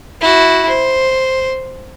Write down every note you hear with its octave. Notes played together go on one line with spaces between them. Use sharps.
E4 F#4
C5